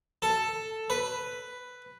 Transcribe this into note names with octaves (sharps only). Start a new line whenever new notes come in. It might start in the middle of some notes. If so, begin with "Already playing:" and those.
A4
B4